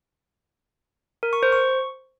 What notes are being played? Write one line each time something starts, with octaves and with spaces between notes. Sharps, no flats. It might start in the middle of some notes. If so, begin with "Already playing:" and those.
A#4
C#6
C5
C#6